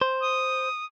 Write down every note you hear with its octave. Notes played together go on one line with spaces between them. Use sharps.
C5
D#6